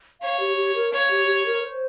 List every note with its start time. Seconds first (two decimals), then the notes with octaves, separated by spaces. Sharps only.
0.22 C#5 F5
0.39 G4
0.57 G4
0.74 A#4
0.92 C#5 F5
1.10 G4
1.27 G4
1.45 A#4
1.62 C5